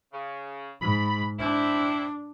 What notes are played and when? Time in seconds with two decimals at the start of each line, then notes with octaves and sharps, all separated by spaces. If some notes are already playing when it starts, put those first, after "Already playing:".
0.13 C#3
0.81 G#2 B5
1.39 C4 D4 E4